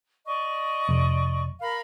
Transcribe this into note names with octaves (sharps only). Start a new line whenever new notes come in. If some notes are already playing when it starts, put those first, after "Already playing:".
D5 D#5 C#6
F1
A#4 F5 B5